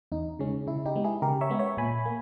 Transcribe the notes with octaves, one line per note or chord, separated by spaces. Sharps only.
E2 D#4
C#3 G#3 C#4
C#3 E4
D#4 G4
G#3 B3
E4 G#4
C#3 G4 A#4
C#5 E5
G#3 B3
C#5 E5
A#2 G#5 B5
A#3